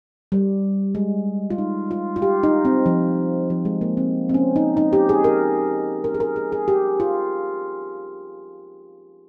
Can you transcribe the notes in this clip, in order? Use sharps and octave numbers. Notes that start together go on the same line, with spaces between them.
G3
G#3
F4
D#4
F4
F4
G4
D#4
C4
F3
F3
G#3
A#3
C4
C4
C#4
D#4
D#4
G4
G#4
A#4
A#4
G#4
A#4
G#4
G#4
G4
F4